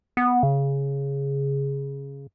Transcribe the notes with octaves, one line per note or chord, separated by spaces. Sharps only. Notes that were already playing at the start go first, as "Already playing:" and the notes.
B3
C#3